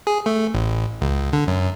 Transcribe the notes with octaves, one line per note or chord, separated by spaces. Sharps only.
G#4
A3
A1
C#2
D3
F#2